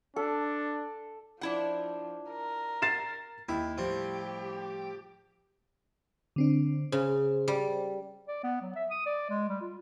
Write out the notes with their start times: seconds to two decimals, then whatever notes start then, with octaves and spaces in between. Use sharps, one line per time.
0.16 D4 A4
1.41 F3 D4 E4 F#5
2.31 A#4
2.82 A6 C7 E7
3.48 D#2 E4 G4
3.78 A2 F3 G3 C4 G4
6.36 D3 C4 D4
6.92 C#3 C5
7.48 G3
8.28 D5
8.43 B3
8.62 F#3
8.76 E5
8.91 D#6
9.06 D5
9.30 G#3
9.49 G3
9.61 F4